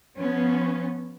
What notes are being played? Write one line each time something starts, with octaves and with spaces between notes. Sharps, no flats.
F3 B3 C#4